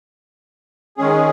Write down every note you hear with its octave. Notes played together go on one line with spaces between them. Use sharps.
D#3 G#3 C#4 G#4